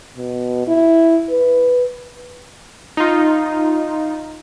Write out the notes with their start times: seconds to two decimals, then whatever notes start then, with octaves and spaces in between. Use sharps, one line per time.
0.17 B2
0.68 E4
1.30 B4
2.97 D#4 F4